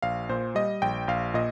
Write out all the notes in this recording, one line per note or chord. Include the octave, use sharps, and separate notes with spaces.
A#1 F5
A#2 C5
G3 D#5
A#1 G5
A#1 F5
A#2 D#5